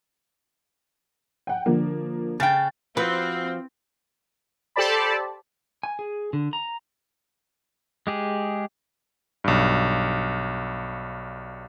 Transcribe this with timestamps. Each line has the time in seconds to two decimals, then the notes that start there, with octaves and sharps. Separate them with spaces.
1.47 F#5 G5
1.66 D3 F3 A#3
2.40 C#3 G5 A6
2.97 F3 C4 F#4 B4 F5
4.76 G4 A4 C5 D5 A5 B5
5.83 G#5
5.99 G#4
6.33 D3
6.53 A#5
8.07 G#3 G4 G#4
9.44 B1 G2